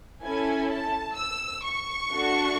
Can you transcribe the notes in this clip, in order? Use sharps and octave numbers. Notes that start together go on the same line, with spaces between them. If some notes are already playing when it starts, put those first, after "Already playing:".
C#4 E4 A4 G#5
A5
E6
C#6
A3 D4 F#4 A4